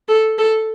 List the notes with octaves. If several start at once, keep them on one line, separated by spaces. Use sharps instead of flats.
A4
A4